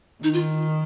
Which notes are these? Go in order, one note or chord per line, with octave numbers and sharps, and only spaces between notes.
D#3 D#4
F4